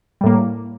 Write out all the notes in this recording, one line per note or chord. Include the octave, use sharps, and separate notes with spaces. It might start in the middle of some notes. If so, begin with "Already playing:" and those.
A2 G3 A#3